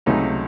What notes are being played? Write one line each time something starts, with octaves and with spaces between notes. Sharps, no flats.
C#2 C3 F#3 A3 D#4